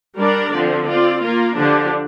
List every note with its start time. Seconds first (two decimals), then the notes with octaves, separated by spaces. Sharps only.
0.19 G3 D4 A#4 D5
0.53 D3 F3 C4
0.88 C4 F4 D5
1.22 A#3 F4 A#4
1.56 D3 F3 D4 G4